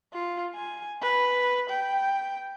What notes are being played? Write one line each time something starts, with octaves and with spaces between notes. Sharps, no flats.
F4
G#5
B4
G5